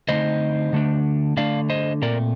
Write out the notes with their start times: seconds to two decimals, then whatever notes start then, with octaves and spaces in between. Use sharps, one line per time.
0.09 D3 A3 C4 D#4 C5 D#5
0.73 D3 A3 D4
1.37 D3 A3 D4 D5 F5
1.70 C5 D#5
2.02 A#2 A3 C4 A#4 D5